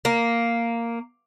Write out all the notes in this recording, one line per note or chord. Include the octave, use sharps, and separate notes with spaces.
A#3